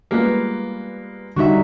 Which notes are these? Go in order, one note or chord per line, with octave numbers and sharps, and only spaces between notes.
G3 G#3 A#3 B3 F4 B4
D3 G3 D#4 F#4 E5